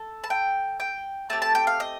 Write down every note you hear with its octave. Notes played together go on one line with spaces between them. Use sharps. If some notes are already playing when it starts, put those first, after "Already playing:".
Already playing: A4
A5
G5
G5
A3 C4 G4 A5
A5
G5
F5
D#5